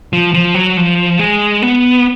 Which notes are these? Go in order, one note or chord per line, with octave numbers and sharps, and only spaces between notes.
F3
F3
F#3
F3
G#3
B3